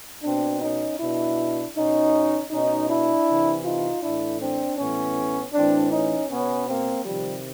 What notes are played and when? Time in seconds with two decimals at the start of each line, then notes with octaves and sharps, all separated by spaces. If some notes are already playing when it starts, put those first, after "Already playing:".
0.24 B2 C4 D4
0.61 C#4 D#4
1.00 B2 D4 E4
1.75 B2 C#4 D#4
2.51 B2 C#4 D#4
2.89 D4 E4
3.27 C3 E3
3.65 D#4 F4
4.03 A2 E3 D4 E4
4.40 C4 D4
4.78 A2 E3 B3 C#4
5.54 A2 E3 C4 D4
5.92 C#4 D#4
6.30 B2 B3 C#4
6.68 A#3 C4
7.05 C3 D#3 F3 G3